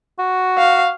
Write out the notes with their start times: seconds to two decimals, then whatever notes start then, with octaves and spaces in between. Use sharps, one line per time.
0.19 F#4
0.58 F5